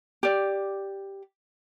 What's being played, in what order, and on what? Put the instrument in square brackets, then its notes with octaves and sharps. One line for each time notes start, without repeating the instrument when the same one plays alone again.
[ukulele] G4 D5